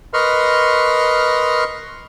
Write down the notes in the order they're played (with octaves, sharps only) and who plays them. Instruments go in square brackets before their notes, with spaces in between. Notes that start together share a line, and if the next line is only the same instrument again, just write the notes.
[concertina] A#4 B4 D#5 C6 C#6 F6